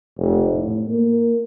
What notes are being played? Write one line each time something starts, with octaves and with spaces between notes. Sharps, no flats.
F1
A2
A#3